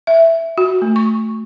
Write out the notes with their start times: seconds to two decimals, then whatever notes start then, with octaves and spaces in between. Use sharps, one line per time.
0.07 E5
0.58 F#4
0.82 A3
0.96 C#6